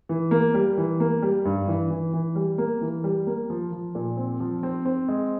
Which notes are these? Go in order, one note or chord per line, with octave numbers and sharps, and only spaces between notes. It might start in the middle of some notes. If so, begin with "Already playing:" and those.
E3
A#3
G3
E3
A#3
G3
G2
E3
E3
E3
G3
A#3
E3
G3
A#3
F3
F3
A#2
C4
F3
C4
C4
G#3